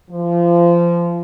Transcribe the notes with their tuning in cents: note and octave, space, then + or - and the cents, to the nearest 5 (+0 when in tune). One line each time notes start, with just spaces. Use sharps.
F3 -25